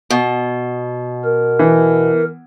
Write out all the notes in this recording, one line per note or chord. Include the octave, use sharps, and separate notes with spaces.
B2
A#4
E3